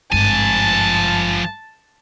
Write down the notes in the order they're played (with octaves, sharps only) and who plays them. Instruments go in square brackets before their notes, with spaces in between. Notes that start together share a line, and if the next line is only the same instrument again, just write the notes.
[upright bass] G#1 G2 [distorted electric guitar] F3 G#5 [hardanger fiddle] A5